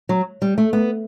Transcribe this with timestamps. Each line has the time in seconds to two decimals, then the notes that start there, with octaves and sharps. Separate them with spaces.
0.09 F#3
0.42 G3
0.58 A3
0.73 B3